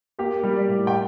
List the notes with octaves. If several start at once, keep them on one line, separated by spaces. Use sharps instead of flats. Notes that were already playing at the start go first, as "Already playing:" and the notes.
A#3 G4
G3
D5
A2
G5